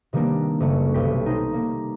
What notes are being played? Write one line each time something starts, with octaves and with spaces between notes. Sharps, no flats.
C3 D#3 G3 A#3 B3 D4
F#1 A3 C#6
B1 C3 A3 G5 B6
D#4 C5
G3 A#3